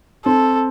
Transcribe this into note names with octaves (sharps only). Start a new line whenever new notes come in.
C4 A4